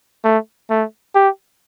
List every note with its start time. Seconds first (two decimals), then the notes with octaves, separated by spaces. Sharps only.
0.24 A3
0.70 A3
1.15 G4